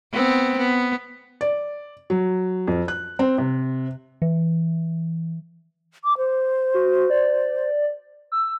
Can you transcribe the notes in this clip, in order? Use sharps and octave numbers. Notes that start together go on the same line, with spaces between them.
B3 C4
B3
D5
F#3
F2
F#6
C4
C3
E3
D6
C5
F#4
D5
E6